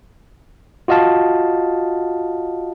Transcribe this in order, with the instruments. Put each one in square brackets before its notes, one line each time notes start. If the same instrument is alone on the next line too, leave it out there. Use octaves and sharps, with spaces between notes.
[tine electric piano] F4 F#4 D#5 F5 A5